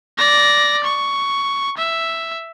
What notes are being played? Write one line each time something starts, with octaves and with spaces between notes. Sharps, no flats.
D5 A#6
C#6
E5